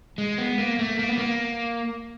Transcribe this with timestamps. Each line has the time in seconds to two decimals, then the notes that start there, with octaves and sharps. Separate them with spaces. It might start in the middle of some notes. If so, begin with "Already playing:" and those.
0.18 G#3
0.38 B3
0.58 A#3
0.79 A3
0.99 A#3
1.09 B3
1.18 A#3